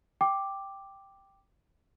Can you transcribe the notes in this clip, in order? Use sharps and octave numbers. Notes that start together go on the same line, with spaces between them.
G5 D6